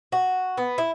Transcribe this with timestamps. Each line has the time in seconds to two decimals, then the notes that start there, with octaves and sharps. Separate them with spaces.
0.12 F#4
0.58 B3
0.78 E4